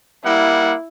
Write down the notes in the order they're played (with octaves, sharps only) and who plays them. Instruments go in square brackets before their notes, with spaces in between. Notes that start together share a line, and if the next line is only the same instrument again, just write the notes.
[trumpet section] G3 A#3 F#5 [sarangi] E4